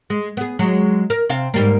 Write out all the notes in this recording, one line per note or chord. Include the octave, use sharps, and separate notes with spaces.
G#3
B3 G#4
F#3 G#3
A#4
C3 C4 F5
G#2 G3 A#3